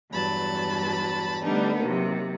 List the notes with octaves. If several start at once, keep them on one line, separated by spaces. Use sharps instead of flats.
E2 G2 F#3 A5 B5
D3 G3 A3 B3 D4 D#4
D#2 C3 F#3